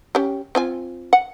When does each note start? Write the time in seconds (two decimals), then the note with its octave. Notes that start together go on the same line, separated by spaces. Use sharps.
0.15 C#4 G4
0.55 C4 F4 G#5
1.13 F#5